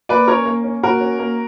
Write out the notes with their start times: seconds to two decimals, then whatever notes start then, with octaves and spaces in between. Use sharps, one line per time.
0.09 A#3 B4 D5
0.28 C#4 A#4 C#5
0.46 A#3
0.64 C#4
0.83 A#3 F#4 A#4
1.01 C#4
1.19 A#3